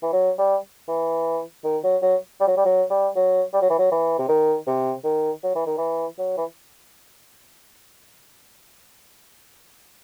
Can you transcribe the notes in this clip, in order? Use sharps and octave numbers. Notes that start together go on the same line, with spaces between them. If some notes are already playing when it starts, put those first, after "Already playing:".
E3
F#3
G3
E3
D#3
F#3
F#3
G3
F#3
G3
F#3
G3
F#3
G3
F#3
E3
F#3
E3
C3
D#3
C3
D#3
F#3
E3
D#3
E3
F#3
E3